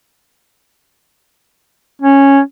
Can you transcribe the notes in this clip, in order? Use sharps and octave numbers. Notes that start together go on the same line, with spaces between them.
C#4